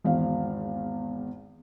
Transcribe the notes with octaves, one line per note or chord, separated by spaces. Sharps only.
G#1 E2 F5